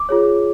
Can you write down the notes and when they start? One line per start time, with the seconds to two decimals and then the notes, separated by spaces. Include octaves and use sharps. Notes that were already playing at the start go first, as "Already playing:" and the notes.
Already playing: D6
0.09 F4 G#4 C#5